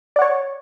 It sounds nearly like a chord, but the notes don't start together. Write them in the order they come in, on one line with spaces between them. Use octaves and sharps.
D5 F#5 C#5